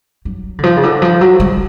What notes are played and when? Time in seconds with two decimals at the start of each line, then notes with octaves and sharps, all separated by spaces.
0.25 F#3
0.59 D3
0.63 F3
0.76 C#3
0.83 D3
1.02 F3
1.21 F#3
1.40 G#3